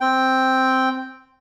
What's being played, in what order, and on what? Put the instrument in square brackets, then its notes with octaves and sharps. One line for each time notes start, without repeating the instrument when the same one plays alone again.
[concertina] C4 G5